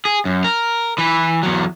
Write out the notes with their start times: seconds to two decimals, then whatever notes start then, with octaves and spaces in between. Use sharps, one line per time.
0.05 G#4
0.25 F#2
0.44 A#4
0.98 E3 B4
1.43 E2 F#3